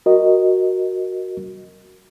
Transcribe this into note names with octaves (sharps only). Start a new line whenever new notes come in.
F#4 A#4 D#5